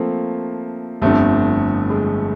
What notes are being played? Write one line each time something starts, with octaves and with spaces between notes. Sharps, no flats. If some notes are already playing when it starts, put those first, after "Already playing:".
Already playing: F3 A3 A#3 C4
G1 F2 D3 A3
G#3